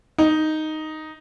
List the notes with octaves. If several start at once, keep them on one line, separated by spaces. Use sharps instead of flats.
D#4